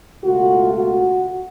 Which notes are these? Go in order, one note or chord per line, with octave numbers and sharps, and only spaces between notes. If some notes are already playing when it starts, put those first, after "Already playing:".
C#2 B2 A3 F4 F#4
F#4